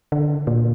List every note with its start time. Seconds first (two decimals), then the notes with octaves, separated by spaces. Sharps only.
0.12 D3
0.47 A#2